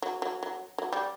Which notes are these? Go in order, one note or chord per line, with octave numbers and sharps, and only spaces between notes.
F#3
F#3
F#3
F#3
G3